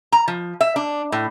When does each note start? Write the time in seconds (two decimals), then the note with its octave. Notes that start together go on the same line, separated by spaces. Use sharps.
0.12 A#5
0.28 F3
0.61 E5
0.76 D4
1.12 A2